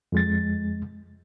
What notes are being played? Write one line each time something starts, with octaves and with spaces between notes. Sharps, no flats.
F2 G#3 A6